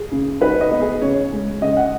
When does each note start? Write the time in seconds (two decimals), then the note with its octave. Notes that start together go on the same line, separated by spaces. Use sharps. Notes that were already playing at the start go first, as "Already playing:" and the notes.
Already playing: G#4
0.12 C#3
0.41 D#4 B4
0.61 D#5
0.71 B3
0.81 G#4
1.01 C#3 C#5
1.32 G#3
1.61 C#3 D#5
1.77 F#5